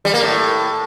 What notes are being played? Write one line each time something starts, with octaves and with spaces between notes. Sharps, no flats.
G3
A#3
A2